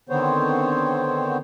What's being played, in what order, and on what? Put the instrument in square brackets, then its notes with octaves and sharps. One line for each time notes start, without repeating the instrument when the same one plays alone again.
[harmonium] D3 D#3 B3 C4 C5 C#5